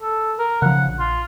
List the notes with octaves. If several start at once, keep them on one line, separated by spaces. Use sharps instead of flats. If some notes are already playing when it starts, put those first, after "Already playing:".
A4
A#4
C#3 F3 F#5
A#1
F4